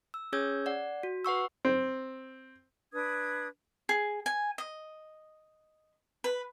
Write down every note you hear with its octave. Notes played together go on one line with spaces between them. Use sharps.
E6
C#4 G#4 C#5 E6 G6 G#6
D5 F#5
F#4
B4 F#5 C#6 E6
C4
D4 B4 D#6 G#6
G#4
G#5
D#5
B4